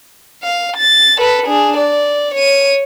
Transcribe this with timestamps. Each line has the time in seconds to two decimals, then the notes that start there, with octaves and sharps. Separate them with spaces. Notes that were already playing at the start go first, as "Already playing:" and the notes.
0.43 F5
0.77 A6
1.18 A4 B4
1.46 D4 G#4
1.77 D5
2.34 C#5 D#7